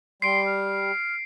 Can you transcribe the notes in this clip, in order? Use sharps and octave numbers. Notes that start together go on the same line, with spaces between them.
G3 C6 C7 D7
F6